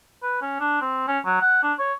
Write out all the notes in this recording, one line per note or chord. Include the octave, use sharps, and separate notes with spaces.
B4
C#4
D4
C4
C#4
F#3
F#5
D4
C#5